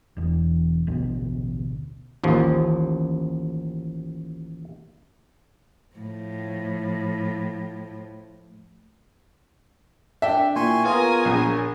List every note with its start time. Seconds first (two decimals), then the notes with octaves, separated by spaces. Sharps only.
0.17 E1 E2
0.87 A1 D2 B2
2.24 A1 D#2 F3
5.96 A2 F3
10.22 D4 E5 G5
10.56 A#2 E4 G#5 C6 C#6
10.84 B3 F4 G#4 A#4 C#5 G#5
11.25 A#1